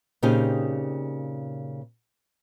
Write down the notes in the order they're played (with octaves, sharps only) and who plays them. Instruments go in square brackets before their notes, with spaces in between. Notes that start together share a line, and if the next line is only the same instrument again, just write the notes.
[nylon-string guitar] A#2 C#3 C4 D#4 G4 G#4